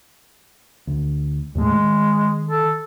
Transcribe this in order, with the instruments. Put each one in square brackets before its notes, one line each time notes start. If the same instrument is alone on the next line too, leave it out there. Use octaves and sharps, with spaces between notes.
[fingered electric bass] D2
[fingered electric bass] D#2 A2 A3 [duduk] G#3
[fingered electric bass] D#3
[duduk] A4